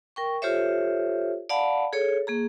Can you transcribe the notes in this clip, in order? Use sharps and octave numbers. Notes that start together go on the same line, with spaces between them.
A#4 G5 C#6
F4 G4 A4 C5 C#5 E5
D5 F5 F#5 A5 B5
G#4 A4 C#5
A#3 G#4 A#5